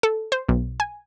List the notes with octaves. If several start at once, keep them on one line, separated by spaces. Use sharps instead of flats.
A4
C5
B1
G#5